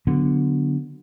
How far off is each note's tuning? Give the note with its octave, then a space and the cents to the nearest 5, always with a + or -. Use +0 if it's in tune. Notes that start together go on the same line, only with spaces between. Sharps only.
D3 +0 F#3 +0 B3 +0